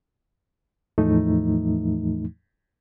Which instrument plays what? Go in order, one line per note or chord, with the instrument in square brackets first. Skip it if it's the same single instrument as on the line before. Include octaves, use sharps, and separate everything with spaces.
[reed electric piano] E2 A2 E3 F3 A3 D#4